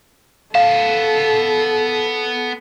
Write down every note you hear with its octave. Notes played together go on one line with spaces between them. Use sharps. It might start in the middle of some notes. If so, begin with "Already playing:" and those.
B3 A4 F5 A5